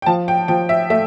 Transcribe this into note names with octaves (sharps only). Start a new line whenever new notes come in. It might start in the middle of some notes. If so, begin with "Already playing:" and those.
G5
F3 A5
G5
F3 G5
E5
A3 E5